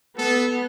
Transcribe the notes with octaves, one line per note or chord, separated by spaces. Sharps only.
B3 A4